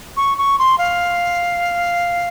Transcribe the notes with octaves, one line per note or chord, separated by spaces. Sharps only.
C#6
C#6
C6
F5